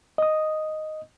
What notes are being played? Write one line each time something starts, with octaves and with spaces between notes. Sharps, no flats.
D#5 D#6